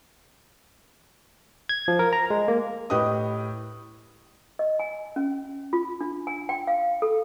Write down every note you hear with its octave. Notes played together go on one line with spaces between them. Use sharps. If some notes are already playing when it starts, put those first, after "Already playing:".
G#6
F3
A#4
A#5
G#3
A#3
A2 G4 B4 D#5 D#6
D#5
G#5
C#4
F4
D4
G#5
G5
F5
A4